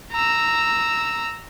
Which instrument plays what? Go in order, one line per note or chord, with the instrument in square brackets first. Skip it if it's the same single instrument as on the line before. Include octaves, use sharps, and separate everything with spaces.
[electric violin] A#5 E6